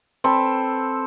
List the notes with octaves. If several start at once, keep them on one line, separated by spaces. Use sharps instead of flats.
C4 A4 B5